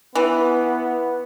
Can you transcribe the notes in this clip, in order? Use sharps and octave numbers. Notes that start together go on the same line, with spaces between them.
E3 B3